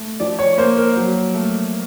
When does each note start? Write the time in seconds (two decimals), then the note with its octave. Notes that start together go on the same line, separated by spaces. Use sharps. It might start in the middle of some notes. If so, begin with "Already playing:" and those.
Already playing: A3
0.20 F3 D5
0.39 C#5
0.58 A#3 C5
0.77 A#4
0.96 F#3
1.34 A3